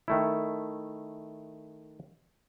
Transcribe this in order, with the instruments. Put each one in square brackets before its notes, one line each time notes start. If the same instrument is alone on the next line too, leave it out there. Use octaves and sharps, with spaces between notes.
[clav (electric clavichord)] D#3 A3 E4